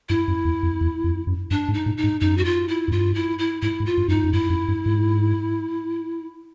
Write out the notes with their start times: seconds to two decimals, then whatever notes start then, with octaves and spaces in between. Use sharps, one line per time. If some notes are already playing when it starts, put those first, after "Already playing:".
0.09 G2 E4
0.28 F#2
0.45 E2
0.63 F2
0.81 E2
1.04 F2
1.27 F#2
1.50 G2 D4
1.68 G#2
1.74 D#4
1.86 A2
1.97 D#4
2.03 G#2
2.21 F#2 D#4
2.38 F#4
2.45 F4
2.69 E4
2.88 F#2
2.92 G2 F4
3.15 E4
3.39 E4
3.62 G#2 E4
3.80 G#2
3.86 F4
3.97 G2
4.08 F#2 D#4
4.14 G2
4.24 F#2
4.33 G2 E4
4.50 F#2
4.68 G2
4.86 G#2